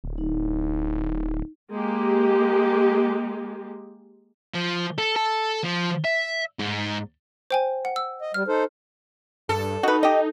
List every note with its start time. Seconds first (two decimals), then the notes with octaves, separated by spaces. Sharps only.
0.04 D1
0.18 D#4
1.71 G#3 A#3 G4
4.54 F3
4.98 A4
5.16 A4
5.63 F3
6.04 E5
6.59 G#2
7.51 C5 G5 G#5
7.85 F#5
7.96 E6
8.22 D#5
8.34 G3 F6
8.48 D#4 A4 C5
9.49 G2 A4
9.83 D#4 F#4 B4
10.03 G4 D#5